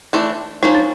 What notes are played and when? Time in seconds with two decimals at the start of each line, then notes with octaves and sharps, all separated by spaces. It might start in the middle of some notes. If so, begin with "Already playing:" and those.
0.13 E3 A3 D4
0.63 F3 A#3 C#4 D#4
0.75 D4